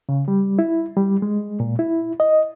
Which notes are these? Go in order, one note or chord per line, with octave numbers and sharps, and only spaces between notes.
C#3
G3
E4
G3
G#3
A#2
E4
D#5